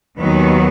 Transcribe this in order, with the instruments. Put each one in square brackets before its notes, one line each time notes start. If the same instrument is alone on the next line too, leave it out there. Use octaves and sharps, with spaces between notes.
[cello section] D#2 D#3 F#3 B3